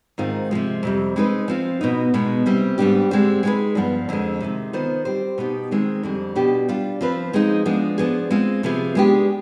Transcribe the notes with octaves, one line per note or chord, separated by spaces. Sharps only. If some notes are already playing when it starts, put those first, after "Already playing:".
G#2 D#3 G#3 C4 F4
C3 F3 G#3
F2 C3 G3
G#3 C4 D#4 B4
F3 C4 F4
B2 B3 D#4
B2 G#3 B3 D#4
C3 G3 C4
G#2 G3 B3 D4 G4
D3 G#3 C4 G4 C5
G#3 B3 D#4 G#4 B4
G2 F3 B3
F2 D3 G#3
C3 D#3 G#3
D#3 B3 F4 C5 D#5
G3 C4 G4 C5
B2 B3 D#4 G4
D#3 G#3 C4
F2 D3 G3
B2 B3 D4 G4
G3 D4 F4
F3 C4 F4 B4
F3 G#3 C4 D#4 G#4
F3 G#3 B3 D4
F3 B3 D4 G#4
G#3 C4 F4
C3 F3 B3 F4 G#4
G#3 B3 D4 G4